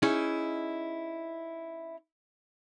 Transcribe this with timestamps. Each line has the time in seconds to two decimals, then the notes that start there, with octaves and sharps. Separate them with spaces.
0.02 C#4 D#4 E4 G#4